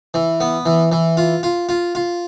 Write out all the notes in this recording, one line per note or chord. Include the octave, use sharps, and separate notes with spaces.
E3
B3
E3
E3
F4
F4
F4
F4